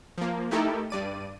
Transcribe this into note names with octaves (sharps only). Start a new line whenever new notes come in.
F3 A#3
A3 D#4 E4 G4 A4 A#4
G2 D5 D#7